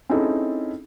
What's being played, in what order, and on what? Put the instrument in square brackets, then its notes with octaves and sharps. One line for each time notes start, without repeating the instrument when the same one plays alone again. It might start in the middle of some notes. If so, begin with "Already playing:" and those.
[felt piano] C4 C#4 D#4 E4 G#4 A4